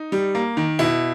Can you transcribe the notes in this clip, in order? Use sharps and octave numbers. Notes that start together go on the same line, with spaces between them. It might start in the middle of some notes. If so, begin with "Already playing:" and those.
Already playing: D#4
G3
A#3
D#3
B2 E4